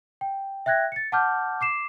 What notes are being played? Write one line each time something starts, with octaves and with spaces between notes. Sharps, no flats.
G5
E5 G5 F#6 G#6 A#6
A6 C#7
F#5 A5 D6 F6 G6
D6 C7 E7